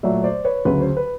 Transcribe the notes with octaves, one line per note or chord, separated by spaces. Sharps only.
A#2 F#3 A3 D5 E5
C5 D5
B4 C#5
D2 C#3 F#3 B4
C5
B4